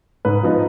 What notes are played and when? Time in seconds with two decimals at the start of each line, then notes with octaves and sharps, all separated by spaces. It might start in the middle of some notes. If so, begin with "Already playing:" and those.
0.25 G#2 B4
0.43 F3 B3 D#4